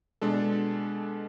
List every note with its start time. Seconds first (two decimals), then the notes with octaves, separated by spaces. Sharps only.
0.22 B2 G#3 D4 A4